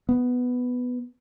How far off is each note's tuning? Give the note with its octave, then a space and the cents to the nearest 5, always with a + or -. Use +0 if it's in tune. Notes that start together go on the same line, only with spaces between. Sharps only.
B3 +5